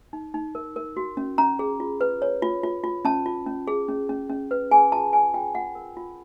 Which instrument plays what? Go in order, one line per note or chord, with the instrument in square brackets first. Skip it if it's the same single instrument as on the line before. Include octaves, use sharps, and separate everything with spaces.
[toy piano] D#4
D#4
A#4
A#4
F#4
C#4
C#4 A#5
G#4
F4
B4
C#5
F4
F4
F4
C#4 A5
F4
C#4
G#4
C#4
C#4
C#4
B4
G#4 G#5
F4 A5
G#4 G#5
F4 G5
F4 F#5
A#4
F4